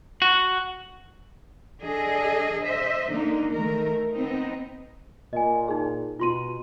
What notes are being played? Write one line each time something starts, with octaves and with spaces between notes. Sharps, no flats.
F#4
D4 G#4 A4 D#5
C5 D#5 E5
D3 A#3 D4 D#4
D#3 A3 A#4
B3 C4 D#4
A#2 D#5 G#5
D#4 G#4
B2 F4 C6 D#7